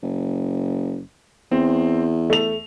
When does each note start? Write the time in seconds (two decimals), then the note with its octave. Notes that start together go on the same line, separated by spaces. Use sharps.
0.03 F#1
1.51 E2 C4
2.30 A3 F7